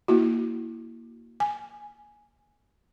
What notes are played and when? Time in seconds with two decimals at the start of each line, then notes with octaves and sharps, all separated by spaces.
0.08 A#3 E4 F#4
1.40 G#5